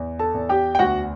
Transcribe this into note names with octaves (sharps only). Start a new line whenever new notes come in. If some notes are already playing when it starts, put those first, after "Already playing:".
Already playing: E2
A4 A5
E2
G4 G5
G5
D2 F#4 F#5